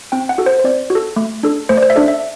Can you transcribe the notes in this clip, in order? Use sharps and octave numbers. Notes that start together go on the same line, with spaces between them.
C4 G5
F#5
F#4 A4
C5
C5
C4 D5
F#4
A4
A3
D4 A4
A3 C5
D5
C5
E5
D4 A4 D5
E5